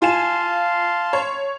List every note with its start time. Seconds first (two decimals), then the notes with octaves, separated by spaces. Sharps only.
0.02 F4 F5 G#5 A5 C6 E7
1.13 C#5